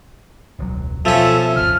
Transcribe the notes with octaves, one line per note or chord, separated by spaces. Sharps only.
E1 C#2 F#3
B2 F3 C#4 A4 E5 A5
D#1 G#1 C#3 F6